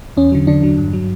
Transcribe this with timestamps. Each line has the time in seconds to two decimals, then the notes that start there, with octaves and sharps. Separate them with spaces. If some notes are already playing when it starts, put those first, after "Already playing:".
0.17 E2 C#4
0.32 D3 F#3
0.47 E2 D3 D4
0.62 D3 F#3
0.78 G2
0.93 F#3